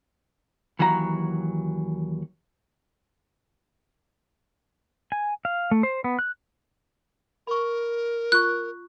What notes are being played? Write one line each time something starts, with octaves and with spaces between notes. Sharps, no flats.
D#2 E3 F#3 F#4 D#5 A#5
G#5
F5
A3
C5
B3
F#6
A#4 B5 C#6
F4 C#6 F#6